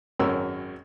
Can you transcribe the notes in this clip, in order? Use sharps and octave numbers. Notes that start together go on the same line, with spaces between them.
G#1 F#2 C#4 A#4 E6